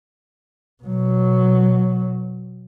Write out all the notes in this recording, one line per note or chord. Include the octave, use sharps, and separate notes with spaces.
B2 F#3